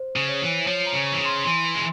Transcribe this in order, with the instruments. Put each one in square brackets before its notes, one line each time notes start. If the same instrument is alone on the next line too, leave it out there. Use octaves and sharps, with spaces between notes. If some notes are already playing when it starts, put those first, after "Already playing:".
Already playing: [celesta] C5
[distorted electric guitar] C#3
[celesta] C#5
[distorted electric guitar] E3
[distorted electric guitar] F3 [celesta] C#5
[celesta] A#5
[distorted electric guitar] C#3
[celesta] C#6
[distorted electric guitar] E3
C#3
[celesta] C6
[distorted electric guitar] E3 [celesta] C6
[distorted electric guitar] G#3